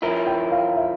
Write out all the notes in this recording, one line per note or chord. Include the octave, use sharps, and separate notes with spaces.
F3 C#4 E4 A#4 E5
G5
F5
E5